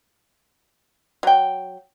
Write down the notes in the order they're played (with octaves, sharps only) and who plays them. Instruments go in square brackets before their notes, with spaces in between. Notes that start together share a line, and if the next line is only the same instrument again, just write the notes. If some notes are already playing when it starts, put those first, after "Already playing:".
[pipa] F#3 G5